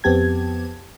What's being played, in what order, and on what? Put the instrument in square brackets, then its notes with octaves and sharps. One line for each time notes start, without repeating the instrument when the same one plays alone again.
[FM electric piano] F2 B3 C4 G4 A5 G#6